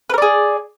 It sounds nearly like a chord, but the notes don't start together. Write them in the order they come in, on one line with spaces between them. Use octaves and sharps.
B4 A#4 D5 G#4